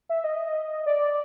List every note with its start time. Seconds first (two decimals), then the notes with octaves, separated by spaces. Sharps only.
0.09 E5
0.24 D#5
0.86 D5